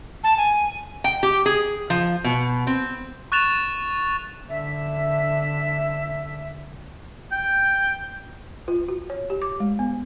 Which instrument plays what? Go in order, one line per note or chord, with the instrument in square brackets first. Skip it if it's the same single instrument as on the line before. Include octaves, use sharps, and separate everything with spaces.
[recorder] A5
G#5
[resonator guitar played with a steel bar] G5
G4
G#4
F3
B2
C4
[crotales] C#6 F#6 A6 E7 F7
[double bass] D3 [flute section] E5
[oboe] G5
[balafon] F4
F#4
C#5
G4
D6
G#3
B3